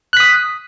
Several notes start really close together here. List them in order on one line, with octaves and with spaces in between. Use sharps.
F#6 B6 D#6